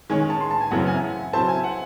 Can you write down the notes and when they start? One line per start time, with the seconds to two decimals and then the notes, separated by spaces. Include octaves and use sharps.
0.10 D#3 G#3 C#4 G#5
0.20 G#5
0.30 A5
0.41 C6
0.51 A5
0.61 G#5
0.71 F#2 C#3 E3 C4 E4 F#5
0.87 G#5
1.33 C#3 F#3 C4 E4 C5 A5
1.48 G#5
1.64 F#5